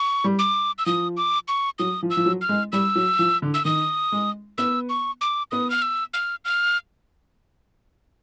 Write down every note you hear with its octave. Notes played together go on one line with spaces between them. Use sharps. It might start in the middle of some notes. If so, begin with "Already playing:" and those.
Already playing: C#6
G3
D6
E6
F3 D#6
D6
C#6
F#3 D#6
F3
E6
F3
F#3
F6
G#3
G3 E6
F#3
F3
D3
E6
D#3 D#6
G#3
B3 E6
C#6
D6
B3 D#6
F6
E6
F6
F6